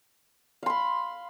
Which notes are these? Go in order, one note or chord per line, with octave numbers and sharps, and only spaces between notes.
F5 B5 C6